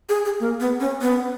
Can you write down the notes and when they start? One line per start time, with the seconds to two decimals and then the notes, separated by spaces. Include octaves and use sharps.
0.09 G#4
0.25 G#4
0.40 A#3
0.60 B3
0.80 C#4
1.01 B3